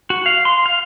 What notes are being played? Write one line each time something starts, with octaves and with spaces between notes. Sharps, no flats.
F#4
F5
C6
F5